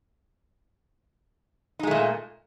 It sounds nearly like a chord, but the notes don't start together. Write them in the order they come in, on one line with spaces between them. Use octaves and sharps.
D#4 G#3 A3 A#2